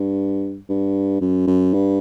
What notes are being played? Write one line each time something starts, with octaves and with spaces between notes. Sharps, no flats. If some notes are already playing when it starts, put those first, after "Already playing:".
Already playing: G2
G2
F#2
F#2
G2